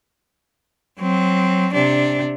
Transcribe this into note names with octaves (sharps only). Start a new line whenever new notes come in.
F#3 C4
C3 D4